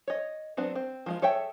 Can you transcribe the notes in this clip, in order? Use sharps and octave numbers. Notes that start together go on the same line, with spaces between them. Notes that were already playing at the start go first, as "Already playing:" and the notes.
C#5 D#5
F#3 B3 C4 D4
C4
F3 G#3 F4
G#4 A4 C#5 E5 G5